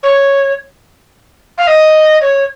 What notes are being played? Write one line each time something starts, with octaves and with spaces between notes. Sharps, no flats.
C#5
F5
D#5
C#5